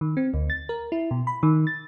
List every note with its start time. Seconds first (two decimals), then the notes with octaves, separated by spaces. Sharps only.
0.01 D#3
0.17 C4
0.34 D2
0.50 A6
0.69 A#4
0.92 E4
1.11 B2
1.27 B5
1.43 D#3
1.67 A6